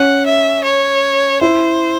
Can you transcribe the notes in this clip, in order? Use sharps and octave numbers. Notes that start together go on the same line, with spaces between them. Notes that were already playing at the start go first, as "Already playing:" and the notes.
Already playing: C#4 F#5
E5
C#5
E4 C5